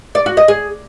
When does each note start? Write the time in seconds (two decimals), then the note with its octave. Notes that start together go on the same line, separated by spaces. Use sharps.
0.15 D5
0.26 F#4
0.37 D#5
0.48 G#4